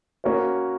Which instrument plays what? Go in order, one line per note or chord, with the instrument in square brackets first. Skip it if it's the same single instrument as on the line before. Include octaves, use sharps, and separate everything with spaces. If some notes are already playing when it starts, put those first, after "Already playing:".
[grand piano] A#3 C#4 F#4 A#4 C#5